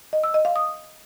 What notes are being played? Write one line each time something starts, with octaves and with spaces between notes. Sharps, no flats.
D#5
E6
D#5
F5
D#6